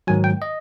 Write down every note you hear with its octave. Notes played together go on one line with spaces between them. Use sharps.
G#2 D#3 F#3 G#5
G5
D#5